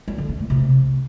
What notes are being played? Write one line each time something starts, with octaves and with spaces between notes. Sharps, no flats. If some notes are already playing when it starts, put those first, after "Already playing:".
G3
D3
B3
A3
C3